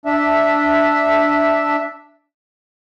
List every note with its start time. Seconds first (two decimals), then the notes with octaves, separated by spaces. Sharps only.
0.05 D4 E5